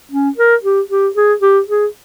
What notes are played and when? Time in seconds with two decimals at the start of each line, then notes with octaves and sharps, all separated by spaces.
0.11 C#4
0.37 A#4
0.63 G4
0.90 G4
1.15 G#4
1.41 G4
1.68 G#4